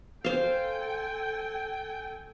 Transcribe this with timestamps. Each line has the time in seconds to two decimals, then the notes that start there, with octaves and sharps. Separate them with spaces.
0.24 A4 C5 F5 G5 G#5